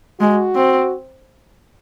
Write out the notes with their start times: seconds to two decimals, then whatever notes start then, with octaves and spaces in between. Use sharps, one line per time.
0.20 G#3 F#4
0.55 C4